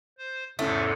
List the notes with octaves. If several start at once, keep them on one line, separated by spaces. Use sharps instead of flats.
C5
E2 G#2 C3 A3 C#4 E4 C#5